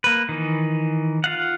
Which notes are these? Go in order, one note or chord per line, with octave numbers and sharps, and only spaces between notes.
A#3 B4
D#3 E3
F4 F5 F#5